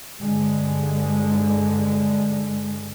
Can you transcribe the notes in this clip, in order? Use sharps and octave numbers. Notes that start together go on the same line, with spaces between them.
G2 D3 G#3